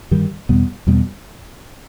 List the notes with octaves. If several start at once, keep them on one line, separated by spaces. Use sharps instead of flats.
G2 D#3 G3
E2 B2 G3 B3
E2 B2 G3 B3